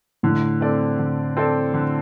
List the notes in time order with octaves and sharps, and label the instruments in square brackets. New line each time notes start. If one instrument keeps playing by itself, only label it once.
[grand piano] A2 [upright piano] D3
[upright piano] C4 A4 D5
D3
C4 A4 D5
D3